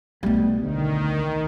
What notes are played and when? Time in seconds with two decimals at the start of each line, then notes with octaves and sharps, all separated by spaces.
0.23 B1 B2 G3 A3
0.63 D2 D#3